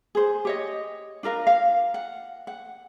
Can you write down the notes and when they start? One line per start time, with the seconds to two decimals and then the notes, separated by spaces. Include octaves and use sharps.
0.15 G#4 C5
0.45 G4 C#5 D#5
1.23 D4 F4 A#4 F5
1.47 F5
1.94 F#5
2.47 F#5